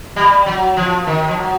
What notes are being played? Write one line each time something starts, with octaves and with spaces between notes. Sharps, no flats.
G3
F#3
F3
D#3
F3
F#3